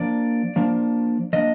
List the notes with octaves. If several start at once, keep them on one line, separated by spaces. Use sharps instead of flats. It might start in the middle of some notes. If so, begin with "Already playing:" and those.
Already playing: F3 A#3 D4 D5
F3 A#3 D4
F3 A#3 D4 D#5